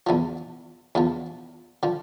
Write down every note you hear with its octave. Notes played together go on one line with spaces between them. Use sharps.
E2 D3 F3
E2 D3 F3
D3 F3